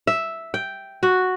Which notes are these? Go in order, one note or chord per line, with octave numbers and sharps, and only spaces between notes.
E5
G5
F#4